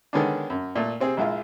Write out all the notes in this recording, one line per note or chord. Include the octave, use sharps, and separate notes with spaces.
D3 D#3 G#3 B3 C#4 D4
F#2
A#2 A3
C3 C4 G#4
A#1 G#3 E4 F4